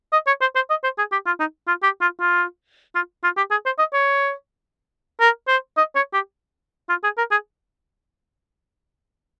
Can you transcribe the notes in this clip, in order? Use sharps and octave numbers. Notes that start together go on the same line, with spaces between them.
D#5
C#5
C5
C5
D#5
C5
G#4
G4
F4
D#4
F4
G4
F4
F4
F4
F4
G4
G#4
C5
D#5
C#5
A#4
C5
D#5
C#5
G4
F4
G#4
A#4
G#4